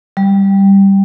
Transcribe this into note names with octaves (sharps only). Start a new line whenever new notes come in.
G3